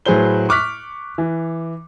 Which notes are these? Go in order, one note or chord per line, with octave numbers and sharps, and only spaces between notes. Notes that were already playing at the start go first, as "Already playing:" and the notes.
A2 F#3 G#4 B4 C5 G7
C#6 D6 F6 F#6 B6
E3